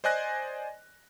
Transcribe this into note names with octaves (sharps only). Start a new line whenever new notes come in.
C5 D5 D#5 G#5 F#6 A#6